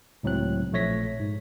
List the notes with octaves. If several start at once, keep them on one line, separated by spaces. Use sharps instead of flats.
C#2 A2 F#3 C4 F#6
A#1 F3 A3 C#5 A#6 B6
G#2